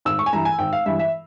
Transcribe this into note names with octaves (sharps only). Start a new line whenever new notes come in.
G#1 E6
C#6
G#5
G2 E3 A#5
G#5
G#1 G5
F5
G2 E3 E5
E5